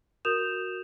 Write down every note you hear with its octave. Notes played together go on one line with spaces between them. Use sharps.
F#4 A#4 D#6 G6 E7 F7